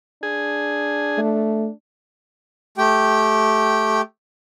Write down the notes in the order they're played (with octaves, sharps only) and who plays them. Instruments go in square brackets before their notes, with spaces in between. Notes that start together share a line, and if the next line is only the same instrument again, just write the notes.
[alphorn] D4 [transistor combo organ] G#4
[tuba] A3
[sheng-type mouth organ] A3 G4 G5